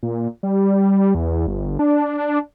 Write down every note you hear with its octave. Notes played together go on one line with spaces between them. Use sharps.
A#2
G3
E2
G1
D4